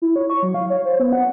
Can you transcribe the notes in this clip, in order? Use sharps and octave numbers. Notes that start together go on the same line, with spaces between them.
E4
C#5
C#6
F#3
F5
C#5
C5
B3
F#5